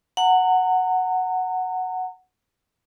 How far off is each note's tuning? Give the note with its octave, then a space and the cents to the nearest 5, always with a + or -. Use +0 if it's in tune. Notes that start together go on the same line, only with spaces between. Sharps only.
F#5 +0 A#5 -35